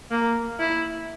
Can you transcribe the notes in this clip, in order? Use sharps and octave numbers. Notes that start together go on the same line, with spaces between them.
A#3
E4